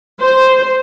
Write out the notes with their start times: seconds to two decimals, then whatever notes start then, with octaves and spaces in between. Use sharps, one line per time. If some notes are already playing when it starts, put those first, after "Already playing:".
0.20 C5